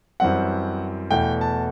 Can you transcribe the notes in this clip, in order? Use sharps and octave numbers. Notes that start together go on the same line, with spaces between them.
F#2 E3 G3 C4 F#5
E2 B2 A3 E4 G5
A5